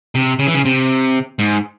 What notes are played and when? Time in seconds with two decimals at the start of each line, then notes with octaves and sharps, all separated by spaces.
0.15 C3
0.39 C#3
0.47 E3
0.54 C#3
0.65 C3
1.39 G#2